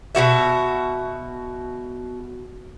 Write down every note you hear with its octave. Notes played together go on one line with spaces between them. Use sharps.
B2 G3 F#4 E5